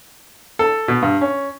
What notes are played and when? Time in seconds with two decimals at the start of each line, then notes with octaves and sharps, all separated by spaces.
0.59 A4
0.88 B2
1.02 G2
1.21 C#4